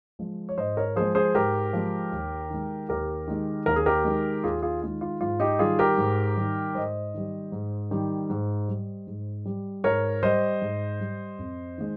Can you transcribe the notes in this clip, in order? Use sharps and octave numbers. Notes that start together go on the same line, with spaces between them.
F3 G#3
C#5
G#2 C5 D#5
A#4 C#5
F3 G#3 G#4 C5
G#4 C5
G#2 G4 A#4
F3 G#3
D#2
D#3 G#3
D#2 G4 A#4
D#3 G#3
D#2 A#4
G#4
G4 A#4
D#3 G#3
D#2 F4 G#4
F4 G#4
D#3 G#3 F4
F4
G#2 F4
D#4 G4
D#3 G3 F4 G#4
G4 A#4
G#2
D#3 G3
G#2 C5 D#5
D#3 G3
G#2
D#3 G3
G#2
G3
G#2
G3
G#2 A#4 C#5
G3 C5 D#5
G#2
G3
F2
D#3 G#3